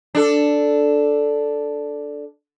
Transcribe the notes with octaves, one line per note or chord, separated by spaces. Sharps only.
D4 A4